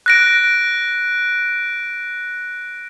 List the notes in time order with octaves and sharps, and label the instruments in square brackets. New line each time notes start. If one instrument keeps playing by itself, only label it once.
[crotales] F#6 A#6 D7